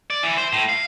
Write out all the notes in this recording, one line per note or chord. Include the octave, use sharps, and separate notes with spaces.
D5
E3
C5
A2
F5